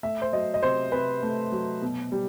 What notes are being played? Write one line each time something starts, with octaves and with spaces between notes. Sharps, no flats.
A3 E5
C5
F#3 D#5
D#5
C3 C5
C3 B4
A3
F#3
B2
G3